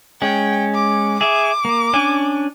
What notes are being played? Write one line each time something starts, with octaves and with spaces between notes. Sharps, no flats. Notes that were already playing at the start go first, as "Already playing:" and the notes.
G#3 C#4 G5
D6
G#4 E5 D6
A#3
C#4 D4 G#5